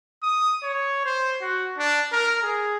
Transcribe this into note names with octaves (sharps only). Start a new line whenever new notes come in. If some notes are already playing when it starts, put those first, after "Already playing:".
D#6
C#5
C5
F#4
D4
A#4
G#4